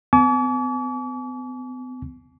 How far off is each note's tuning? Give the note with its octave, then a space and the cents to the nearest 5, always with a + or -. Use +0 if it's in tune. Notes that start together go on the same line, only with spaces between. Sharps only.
B3 +45 G#5 +45 D6 -40